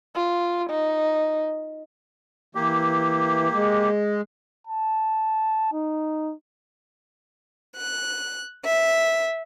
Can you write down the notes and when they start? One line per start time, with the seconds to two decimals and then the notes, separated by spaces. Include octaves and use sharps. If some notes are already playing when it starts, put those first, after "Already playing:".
0.15 F4
0.70 D#4
2.55 E3 A#3 G4
3.53 G#3
4.67 A5
5.73 D#4
7.78 F#6
8.66 E5